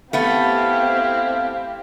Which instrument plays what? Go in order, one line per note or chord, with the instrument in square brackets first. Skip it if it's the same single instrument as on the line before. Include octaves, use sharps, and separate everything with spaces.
[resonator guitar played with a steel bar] A3 B3 [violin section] C4 E4 G4 [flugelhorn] F5